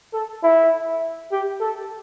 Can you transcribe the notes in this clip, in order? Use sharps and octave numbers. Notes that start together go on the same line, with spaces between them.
A4
E4
G4
A4